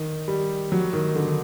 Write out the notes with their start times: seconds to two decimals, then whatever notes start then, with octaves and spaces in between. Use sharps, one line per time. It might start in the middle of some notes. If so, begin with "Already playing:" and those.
Already playing: D#3
0.28 G3
0.72 F#3
0.93 D#3
1.15 D3